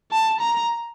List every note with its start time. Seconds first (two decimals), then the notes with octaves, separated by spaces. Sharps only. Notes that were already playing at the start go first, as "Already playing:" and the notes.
0.12 A5
0.41 A#5